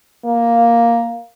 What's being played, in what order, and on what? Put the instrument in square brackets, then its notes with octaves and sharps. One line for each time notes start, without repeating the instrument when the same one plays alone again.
[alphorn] A#3